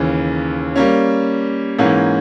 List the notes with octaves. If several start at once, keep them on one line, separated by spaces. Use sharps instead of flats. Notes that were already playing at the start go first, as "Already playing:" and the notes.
Already playing: D#2 C#3 E3
G3 A#3 C#4
G#2 E3 A#3 C#4